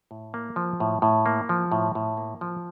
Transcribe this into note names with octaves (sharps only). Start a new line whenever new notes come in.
A2
A#3
F3
A2
A2
A#3
F3
A2
A2
A#3
F3